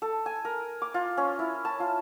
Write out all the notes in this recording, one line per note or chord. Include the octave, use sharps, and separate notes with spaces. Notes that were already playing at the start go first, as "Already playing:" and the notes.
A4
G#5
A#4
D6
F4
C#4
E4
A5
F4